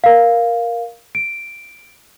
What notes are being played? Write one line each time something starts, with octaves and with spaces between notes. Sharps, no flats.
A#4 F5
D7